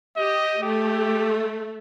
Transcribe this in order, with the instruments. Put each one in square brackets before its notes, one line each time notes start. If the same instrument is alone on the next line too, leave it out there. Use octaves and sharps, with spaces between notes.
[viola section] G4 [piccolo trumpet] D#5
[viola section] A3 [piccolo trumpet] G4